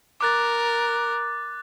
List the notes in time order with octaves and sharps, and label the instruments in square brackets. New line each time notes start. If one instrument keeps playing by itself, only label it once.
[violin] A#4 [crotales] D6 F#6 A6